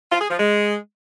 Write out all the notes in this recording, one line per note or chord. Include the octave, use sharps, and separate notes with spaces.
F4
G#4
F3
G#3